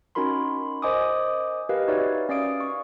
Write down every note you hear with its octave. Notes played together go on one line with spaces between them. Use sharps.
C#4 D#4 F#4 A#4 B5 C6
A#4 C5 D#5 G#5 D6 D#6
G4 A#4 B4 D#5 F5
D#4 F#4 B4 C#5 D5 E5
C#4 D5 F5 D#6 D7
C#6